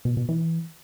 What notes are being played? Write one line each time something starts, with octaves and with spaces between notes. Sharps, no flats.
B2
B2
E3